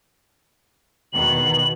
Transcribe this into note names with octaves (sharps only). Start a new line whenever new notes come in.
E2 B2 D#3 F#7